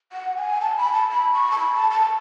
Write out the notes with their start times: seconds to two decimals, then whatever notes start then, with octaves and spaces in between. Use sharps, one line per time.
0.12 F#5
0.37 G#5
0.61 A5
0.77 B5
0.94 A5
1.10 B5
1.34 C#6
1.52 A5
1.59 B5
1.74 A5
1.91 A5